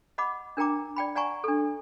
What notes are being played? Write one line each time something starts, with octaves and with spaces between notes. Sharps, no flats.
D#5 F#5 B5 D6
D4 A#4 G5 A#5 D6
D5 G5 B5
D5 F#5 G#5 A#5 C#6
D4 A4